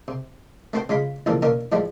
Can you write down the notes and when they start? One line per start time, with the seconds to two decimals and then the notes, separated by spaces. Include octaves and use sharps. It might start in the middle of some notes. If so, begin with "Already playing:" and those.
0.08 C3
0.73 A3 B3 C4 F#4 C5
0.89 C#3 G#3 F4 B5
1.26 C#2 A#2 E3 F3 A4
1.42 B2 D3 A#3 C#4 A#4
1.72 A2 F3 G3 G#3 E4